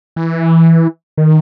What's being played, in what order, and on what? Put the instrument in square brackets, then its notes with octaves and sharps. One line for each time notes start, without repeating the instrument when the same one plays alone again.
[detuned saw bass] E3
D#3